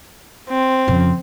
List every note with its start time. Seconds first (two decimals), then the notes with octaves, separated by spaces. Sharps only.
0.49 C4
0.88 F2 C#3